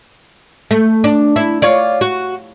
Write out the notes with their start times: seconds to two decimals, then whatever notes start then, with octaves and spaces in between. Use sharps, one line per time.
0.71 A3
1.04 D4
1.36 E4
1.62 F4 C#5 D5
2.01 F#4